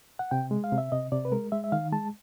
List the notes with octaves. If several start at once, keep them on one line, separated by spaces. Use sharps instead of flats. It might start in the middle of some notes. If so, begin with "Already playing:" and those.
F#5
C3 G5
G#3
F5
C3
E5
C3 D#5
C3 D5
B4
G#3 A#4
G#3 E5
E5
D#3 F5
G#3 A5